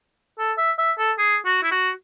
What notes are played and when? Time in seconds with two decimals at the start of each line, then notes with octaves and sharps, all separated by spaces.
0.39 A4
0.58 E5
0.78 E5
0.98 A4
1.18 G#4
1.45 F#4
1.63 E4
1.71 F#4